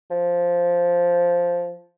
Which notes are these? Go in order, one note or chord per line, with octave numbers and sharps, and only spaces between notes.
F3